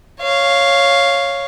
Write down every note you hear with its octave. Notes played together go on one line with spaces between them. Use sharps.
C#5 F5